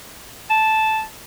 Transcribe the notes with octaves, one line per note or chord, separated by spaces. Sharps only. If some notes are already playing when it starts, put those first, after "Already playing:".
A5